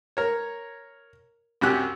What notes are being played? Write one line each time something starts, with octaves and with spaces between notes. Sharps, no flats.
A#4 C#5
C2 F#2 G4 F#6